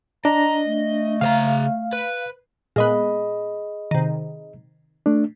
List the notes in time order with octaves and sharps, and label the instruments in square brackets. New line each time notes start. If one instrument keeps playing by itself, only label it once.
[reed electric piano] D4 [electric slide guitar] D#5 [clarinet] A#5
[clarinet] A3
[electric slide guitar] C#3 C5 A#5 [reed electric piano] F5
[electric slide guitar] B4
[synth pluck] A#2 G#3 B3 [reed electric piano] G#4 D#5 B5
[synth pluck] C3 D#3
[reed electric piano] A3 D4